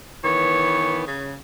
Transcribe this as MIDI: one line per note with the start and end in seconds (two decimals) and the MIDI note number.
0.24 1.06 51
0.24 1.06 52
0.24 1.06 59
0.24 1.04 73
1.07 1.36 49